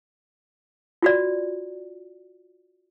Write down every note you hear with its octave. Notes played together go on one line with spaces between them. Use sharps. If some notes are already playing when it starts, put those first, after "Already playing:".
F4 F#4 D5